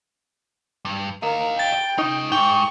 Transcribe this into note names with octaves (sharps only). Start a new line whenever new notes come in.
G2
A#4 D#5 F5
G5 A6
C#4 D#4 D#5
G#2 G5 C#6